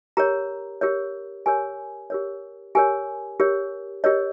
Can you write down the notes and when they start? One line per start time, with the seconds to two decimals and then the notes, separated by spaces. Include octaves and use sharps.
0.17 G4 A#4 C#5 A#5
0.81 G4 A#4 C#5
1.46 G4 A#4 C#5 G#5
2.10 G4 A#4 C#5
2.75 G4 A#4 C#5 G#5
3.40 G4 A#4 C#5
4.04 G4 A#4 C#5 D#5